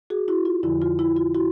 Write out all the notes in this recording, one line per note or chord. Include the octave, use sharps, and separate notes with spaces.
F#4 G#4
E4 F#4
F4
F2 D3 F3 E4
F4
E4
F4
E4 F#4